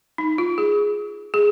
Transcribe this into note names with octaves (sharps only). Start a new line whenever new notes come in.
D#4
F4
G#4
G#4